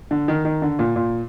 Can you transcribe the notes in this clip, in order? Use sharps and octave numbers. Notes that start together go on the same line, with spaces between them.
D3
D#3
D#3
D3
A#2
A#2